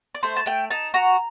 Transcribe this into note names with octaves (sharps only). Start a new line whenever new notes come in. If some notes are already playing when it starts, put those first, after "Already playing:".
D5
A3 C5
A5
A3 G5
D#4 A5
F#4 A#5